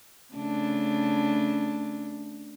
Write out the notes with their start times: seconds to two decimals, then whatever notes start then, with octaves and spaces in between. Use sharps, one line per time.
0.34 C#3 A3 D4